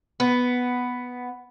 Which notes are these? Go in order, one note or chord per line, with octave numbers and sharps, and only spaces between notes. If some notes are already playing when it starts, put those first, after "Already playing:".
B3